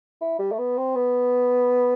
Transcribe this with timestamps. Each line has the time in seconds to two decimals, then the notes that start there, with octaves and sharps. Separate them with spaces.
0.21 E4
0.39 G3
0.52 A3
0.58 B3
0.77 C4
0.96 B3